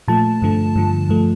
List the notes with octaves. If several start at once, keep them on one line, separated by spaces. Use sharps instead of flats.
A#2 F3 A3 A5
G2 D3 F3 A3
G2 D3 F3
G2 F3 A3